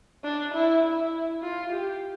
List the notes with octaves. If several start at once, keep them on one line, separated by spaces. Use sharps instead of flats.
D4
E4
E4
F4
G4